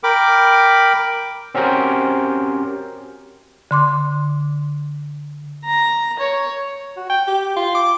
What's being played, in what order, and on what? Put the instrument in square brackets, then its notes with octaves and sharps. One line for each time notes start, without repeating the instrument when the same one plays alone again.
[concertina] A#4 G5 B5 D6
[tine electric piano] C4 C#4 F#4 G4 A#4 C5
[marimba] D3 C6 D6
[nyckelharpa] A#5
C#5
[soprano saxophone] F#4
G5
G4
F4
D6